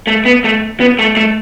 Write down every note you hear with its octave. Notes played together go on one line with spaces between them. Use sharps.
A3
B3
A3
B3
A3
A3